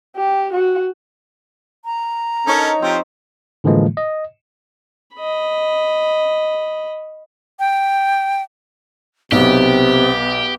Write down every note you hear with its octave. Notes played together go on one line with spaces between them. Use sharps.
G4
F#4
A#5
C#4 D#4 A4 A#4 C#5
F3 C4 G4 C5
A2 D3 E3 F3 G#3 A#3
D#5
D#5 B5
G5
B1 C3 B3 G4